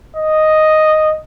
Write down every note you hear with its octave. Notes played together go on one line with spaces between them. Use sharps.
D#5